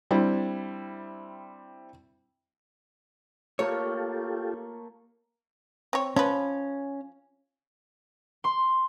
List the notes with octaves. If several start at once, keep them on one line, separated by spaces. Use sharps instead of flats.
G3 C4 D4 E4
A3 A#3 F4 G4 A4 C#5
C4 C#5
F3 C#4 B4
C6